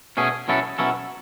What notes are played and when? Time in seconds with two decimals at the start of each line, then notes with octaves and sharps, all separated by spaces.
0.17 B2 A3 C#4 G#4
0.48 B2 F#3 C#4 E4 A4
0.78 B2 F#3 C#4 E4 A4